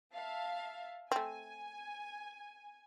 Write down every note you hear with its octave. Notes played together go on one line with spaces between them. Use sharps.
E5 F5 A5
A3 C4 G#5